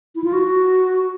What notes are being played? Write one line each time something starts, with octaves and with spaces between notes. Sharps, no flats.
E4
F4
F#4